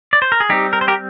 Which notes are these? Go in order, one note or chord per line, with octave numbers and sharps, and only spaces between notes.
D5
C5
A#4
G#4
G3 C4 D#4 G4
A#4
C5
G4 A#4